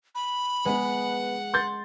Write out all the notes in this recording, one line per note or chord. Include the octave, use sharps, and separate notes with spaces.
B5
G#3 B3 B4 F#5
C6 G6 A6